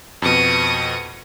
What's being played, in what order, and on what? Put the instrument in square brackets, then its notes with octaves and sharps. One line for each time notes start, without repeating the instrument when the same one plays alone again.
[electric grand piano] F2 B2 [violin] C#6 D#6